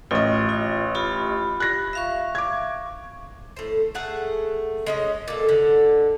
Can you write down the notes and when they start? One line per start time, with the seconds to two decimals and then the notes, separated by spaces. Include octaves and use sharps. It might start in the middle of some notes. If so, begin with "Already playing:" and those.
0.11 A1 F4 D#5
0.49 F4
0.95 F4 G4 B5
1.60 F#6 A#6
1.93 E5 F5 C#6
2.35 D6 G#6
3.57 A2 C5
3.95 A3 G#4 F#5 A5
4.86 G#3 C#4 D#5
5.28 A#2 A4
5.49 D3